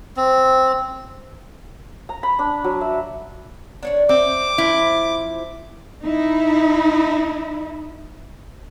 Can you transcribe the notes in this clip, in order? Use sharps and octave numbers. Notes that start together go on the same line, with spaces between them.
C4
A#5
B5
D4
F#3
E5
D4 C#5 D5
C4 E5 D6
F3 C4 E4
D#4 E4